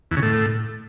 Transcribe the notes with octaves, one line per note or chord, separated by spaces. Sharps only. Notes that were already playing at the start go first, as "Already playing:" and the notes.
E2
C#3
A2